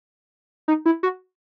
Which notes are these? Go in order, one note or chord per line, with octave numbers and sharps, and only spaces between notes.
D#4
E4
F#4